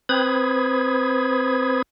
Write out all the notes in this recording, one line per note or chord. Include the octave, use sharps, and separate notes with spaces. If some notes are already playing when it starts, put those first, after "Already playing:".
C4 B4 C5 B5 D#6 G#6